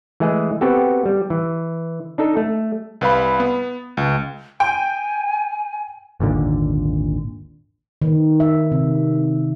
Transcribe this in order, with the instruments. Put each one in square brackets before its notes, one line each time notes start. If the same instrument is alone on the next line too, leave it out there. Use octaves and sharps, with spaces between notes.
[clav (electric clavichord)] E3 G#3 A3 G#4 D#5
B3 C4 F#4 G4 A4
G3
E3
D4 D#4 A4
A3
[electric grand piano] C2 B4 F5 B5
B3
C#2
[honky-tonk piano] G5 [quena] G#5
[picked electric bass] G#1 D#2 A#2 D3
[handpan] D#3
E5
C3